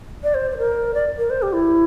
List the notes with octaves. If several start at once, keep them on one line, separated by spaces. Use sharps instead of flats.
D5
C5
C5
A#4
D5
A#4
C5
G4
E4